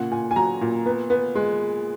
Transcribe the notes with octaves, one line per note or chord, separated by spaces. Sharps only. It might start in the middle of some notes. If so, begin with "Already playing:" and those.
Already playing: A#2 C#3 F#5
A#2 G#5
G#5
F#3 A#5
A#2
B3
B3
G#3